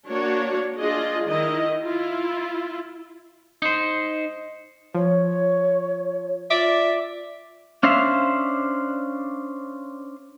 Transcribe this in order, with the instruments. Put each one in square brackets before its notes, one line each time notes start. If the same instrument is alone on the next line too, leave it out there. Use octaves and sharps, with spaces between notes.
[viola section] A#3 D4 F#4 C#5
D4 F4 G#4 D#5
D#3 E4 D#5
E4 F4
[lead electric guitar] D#4 C5
[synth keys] F3 [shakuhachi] C#5
[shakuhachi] F4 [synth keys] D5 D6 [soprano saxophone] E5
[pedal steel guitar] C#4 D4 C5 E5 F5